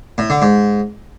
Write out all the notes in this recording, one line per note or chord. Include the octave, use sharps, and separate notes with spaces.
A2
D3
G#2